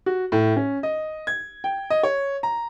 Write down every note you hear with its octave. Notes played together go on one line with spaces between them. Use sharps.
F#4
A2
C#4
D#5
G#6
G5
D#5
C#5
A#5